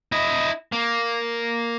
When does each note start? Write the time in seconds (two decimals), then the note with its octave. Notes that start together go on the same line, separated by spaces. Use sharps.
0.12 E4 D#5
0.72 A#3